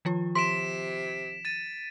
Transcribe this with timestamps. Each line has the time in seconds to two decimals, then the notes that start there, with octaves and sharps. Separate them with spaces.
0.05 D#3 F3 F4
0.35 C3 C6 B6 D7 E7
1.45 A6 D#7